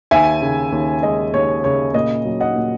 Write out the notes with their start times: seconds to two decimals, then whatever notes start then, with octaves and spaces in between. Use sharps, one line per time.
0.11 D#2 E5 G#5
0.42 C#3
0.72 D#2
1.03 G#3 D#5
1.34 D#2 C#5
1.64 C#3 C#5
1.94 A#2 D#5
2.25 F#3
2.40 D#5 F#5
2.56 A#2